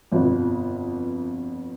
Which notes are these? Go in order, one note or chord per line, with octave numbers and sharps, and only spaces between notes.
G1 F2 B2 F3